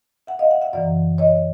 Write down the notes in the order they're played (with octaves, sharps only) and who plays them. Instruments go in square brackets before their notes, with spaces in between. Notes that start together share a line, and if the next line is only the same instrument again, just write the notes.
[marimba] E5 F#5
D#5 F5
E5 F#5
E5 F#5
F#2 C#3 E3 D5 E5
C#5 D#5